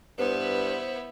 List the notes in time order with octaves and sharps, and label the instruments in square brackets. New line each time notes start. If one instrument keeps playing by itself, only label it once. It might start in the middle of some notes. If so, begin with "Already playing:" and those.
[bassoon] G2 [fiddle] B3 E4 [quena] C5